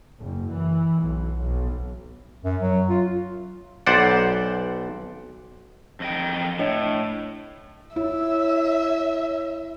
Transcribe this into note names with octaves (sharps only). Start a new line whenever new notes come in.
F#1
E3
B1
B1
F#2
F#3
F4
B1 C5 D5 F#5
F2 D#5 G5
A2 D4 C#5 D#5
E4 C#5 E5